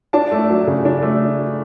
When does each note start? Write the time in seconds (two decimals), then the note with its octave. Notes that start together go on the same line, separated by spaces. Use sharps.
0.13 D4 A5
0.31 A3
0.50 F#3
0.67 C#3
0.85 D4
1.02 A3